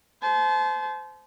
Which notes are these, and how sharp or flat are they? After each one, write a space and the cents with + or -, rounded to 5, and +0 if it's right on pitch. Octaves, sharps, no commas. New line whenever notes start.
C5 -25 A5 -40